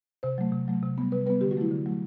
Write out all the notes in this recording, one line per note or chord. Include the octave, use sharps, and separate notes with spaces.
C3 C5
F#3 A3
C3
F#3 A3
C3
G3 B3
C3 B4
G3 B3 B4
D3 G4
F#4
F#3 A3 E4
D3
F#3 A3